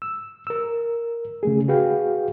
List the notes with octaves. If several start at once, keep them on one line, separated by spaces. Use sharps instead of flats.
E6
A#4 E6
C#3 A3 G#4
F#4 G#4 B4 F5 G5